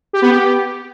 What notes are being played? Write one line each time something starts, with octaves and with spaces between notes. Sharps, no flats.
G4
B3
G4